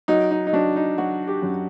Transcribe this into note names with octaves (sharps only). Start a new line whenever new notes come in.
F#3 D#4
D#4
D#4
F#3 D4
D#4
F#3 F#4
G4
F#2